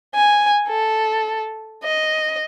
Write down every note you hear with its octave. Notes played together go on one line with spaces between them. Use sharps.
G#5
A4
D#5